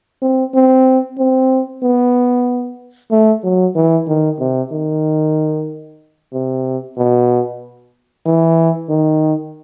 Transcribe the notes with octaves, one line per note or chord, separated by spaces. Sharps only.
C4
C4
C4
B3
A3
F#3
E3
D#3
C3
D#3
C3
B2
E3
D#3